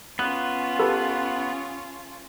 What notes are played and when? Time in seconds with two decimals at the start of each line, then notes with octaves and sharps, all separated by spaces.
0.19 B3 C#4 F4 F#6
0.79 G4 A4 B4